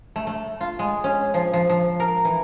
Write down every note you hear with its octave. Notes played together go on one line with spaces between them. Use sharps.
A3
A3
F4
G#3
C#4
F3
F3
F3
A#4
E3